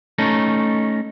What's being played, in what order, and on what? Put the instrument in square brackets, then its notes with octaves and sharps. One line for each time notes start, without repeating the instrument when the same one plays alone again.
[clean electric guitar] A3 C#4 D#4